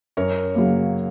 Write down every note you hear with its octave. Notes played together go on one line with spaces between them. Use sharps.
F#2 A#4 C#5
C#3 F#3 A#3